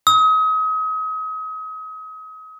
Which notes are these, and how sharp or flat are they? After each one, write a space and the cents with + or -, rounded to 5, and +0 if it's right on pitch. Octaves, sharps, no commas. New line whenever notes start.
D#6 +35